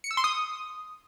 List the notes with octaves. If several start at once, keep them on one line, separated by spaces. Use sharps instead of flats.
C#7
E6
C6
D#6